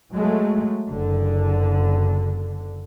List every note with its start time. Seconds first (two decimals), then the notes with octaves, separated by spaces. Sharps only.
0.13 F#3 G#3 A3
0.88 F#1 D3